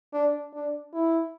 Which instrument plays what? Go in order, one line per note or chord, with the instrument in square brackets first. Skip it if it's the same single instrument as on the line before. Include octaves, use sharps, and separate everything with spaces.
[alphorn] D4
D4
E4